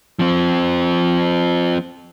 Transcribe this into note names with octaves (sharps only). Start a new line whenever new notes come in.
F3 C4